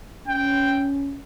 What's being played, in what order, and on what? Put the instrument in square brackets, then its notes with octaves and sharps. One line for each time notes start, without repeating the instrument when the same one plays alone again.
[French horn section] C#4 [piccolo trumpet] G5